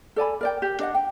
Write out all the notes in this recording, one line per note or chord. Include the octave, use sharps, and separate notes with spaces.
A4 D5 G#5 B5
A#4 D5 G5
G4
D4 D#5 F#5
G5